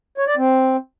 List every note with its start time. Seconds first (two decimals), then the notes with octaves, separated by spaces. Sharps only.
0.18 C#5
0.27 D5
0.37 C4